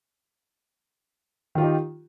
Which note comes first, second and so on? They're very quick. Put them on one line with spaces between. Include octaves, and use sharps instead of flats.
D#3 F4 G4 D#4